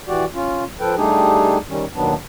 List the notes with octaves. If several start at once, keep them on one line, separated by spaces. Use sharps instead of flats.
E3 F#4 G4 D5
C#4 F4
F3 A4 B4 G5
G3 A3 D4 D#4 G4 G#4
D#3 G3 C#4
D#2 B2 D#3 F#3 B3 D4